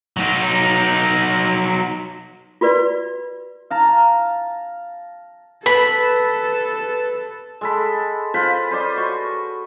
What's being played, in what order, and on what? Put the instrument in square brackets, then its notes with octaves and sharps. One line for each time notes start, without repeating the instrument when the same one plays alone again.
[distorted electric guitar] F#3 D#4
[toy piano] F4 F#4 B4 D5
[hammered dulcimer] F5 A5 A#5
[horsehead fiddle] A4 [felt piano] B4 [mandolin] B5
[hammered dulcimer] G#3 A4 B5
F4 B4 C5 B5
B4 C5 D5 D#5
F#4 C#6